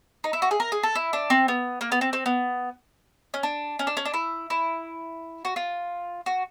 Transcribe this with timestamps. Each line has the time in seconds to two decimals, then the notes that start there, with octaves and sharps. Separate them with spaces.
0.24 D#4
0.33 E4
0.42 F#4
0.51 G#4
0.60 A#4
0.72 G#4
0.83 A4
0.95 E4
1.13 D4
1.30 C4
1.48 B3
1.81 A#3
1.92 B3
2.01 C4
2.13 C4
2.26 B3
3.34 C#4
3.43 D4
3.79 C#4
3.87 D4
3.97 C#4
4.05 D4
4.14 E4
4.50 E4
5.45 F#4
5.56 F4
6.26 F#4